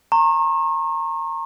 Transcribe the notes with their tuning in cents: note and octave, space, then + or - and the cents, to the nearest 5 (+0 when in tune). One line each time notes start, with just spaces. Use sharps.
A#5 -25 C#6 -40